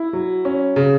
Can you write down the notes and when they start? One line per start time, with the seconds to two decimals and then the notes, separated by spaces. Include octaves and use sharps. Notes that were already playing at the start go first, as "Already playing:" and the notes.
Already playing: E4
0.13 F#3
0.45 C#4
0.76 C#3